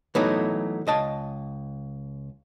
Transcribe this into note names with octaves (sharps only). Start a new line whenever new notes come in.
E3 F#3 A3 B3 D#4
C#2 D#5 A5